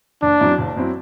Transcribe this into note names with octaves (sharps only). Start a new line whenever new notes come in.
F#1 D4
F#2 F#3 C4 E4
F#1
F#2 F#3 C4 E4